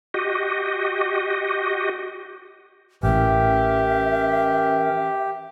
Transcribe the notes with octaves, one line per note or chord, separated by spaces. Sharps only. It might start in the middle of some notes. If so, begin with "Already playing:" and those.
F#4 G4 D#5
A1 A2 E3 C#4 G4 A#4 E5